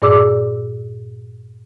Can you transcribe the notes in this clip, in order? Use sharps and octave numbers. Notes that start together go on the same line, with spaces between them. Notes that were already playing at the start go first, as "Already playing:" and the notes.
G2 A#2 G#4 D5 D6 E6